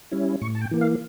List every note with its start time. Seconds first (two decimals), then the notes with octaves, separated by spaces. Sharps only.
0.11 G3 C#4 E4
0.42 A2 C#6
0.55 A5
0.61 G5
0.71 E3 A#3
0.81 F5